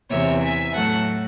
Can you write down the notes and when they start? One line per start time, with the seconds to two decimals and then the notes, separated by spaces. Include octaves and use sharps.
0.10 E2 C3 E3 C#5 E5
0.42 E5 G#5
0.74 A2 F#3 A3 F#5 A5